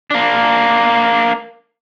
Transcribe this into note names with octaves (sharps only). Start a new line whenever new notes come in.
A#3 D4